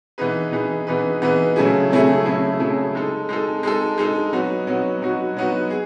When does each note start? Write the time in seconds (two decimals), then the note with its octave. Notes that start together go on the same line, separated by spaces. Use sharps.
0.18 E3 B3 D#4 G#4 B4
0.52 E3 B3 D#4 G#4 B4
0.87 E3 B3 D#4 G#4 B4
1.22 E3 B3 D#4 G#4 B4
1.56 C#3 F#3 A3 E4 G#4
1.91 C#3 F#3 A3 E4 G#4
2.25 C#3 F#3 A3 E4 G#4
2.60 C#3 F#3 A3 E4 G#4
2.95 G#3 D#4 A4
3.29 G#3 D#4 A4
3.63 G#3 D#4 A4
3.98 G#3 D#4 A4
4.33 F#3 B3 D#4 F#4
4.67 F#3 B3 D#4 F#4
5.02 F#3 B3 D#4 F#4
5.37 F#3 B3 D#4 F#4
5.70 G#4